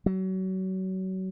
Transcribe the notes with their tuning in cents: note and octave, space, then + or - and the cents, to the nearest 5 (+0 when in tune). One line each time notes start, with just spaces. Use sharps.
F#3 +30